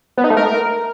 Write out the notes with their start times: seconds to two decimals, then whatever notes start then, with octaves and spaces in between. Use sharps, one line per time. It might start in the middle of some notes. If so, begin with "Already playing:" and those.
0.18 B3
0.24 D#4
0.30 A3
0.37 A#4